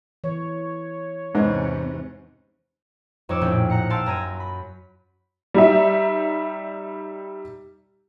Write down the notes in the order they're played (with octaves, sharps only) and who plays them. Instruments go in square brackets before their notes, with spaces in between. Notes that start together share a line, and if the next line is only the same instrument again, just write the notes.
[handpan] E3 [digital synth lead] C#5
[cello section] E2 C3 C#4 [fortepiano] G#2 [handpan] D#4 B4 C5
[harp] F2 D#4 C#5 D6 E6 E7
A#1 A2 C#4 G5
F#5 A#5 C#7
F5 G5 A5 C6 E6
F#2 A#5 G#6 D#7
B5
[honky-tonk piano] G3 D#4 E5